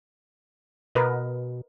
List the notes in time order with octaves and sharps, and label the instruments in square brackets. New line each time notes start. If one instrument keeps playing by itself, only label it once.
[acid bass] B2 [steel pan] A#4 B4 D#5